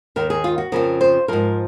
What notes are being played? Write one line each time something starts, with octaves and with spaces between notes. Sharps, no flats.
D#2 D#3 A#4
G#4
F4
F#4
F2 C#3 F3 A#4
C5
G#2 F3 A#4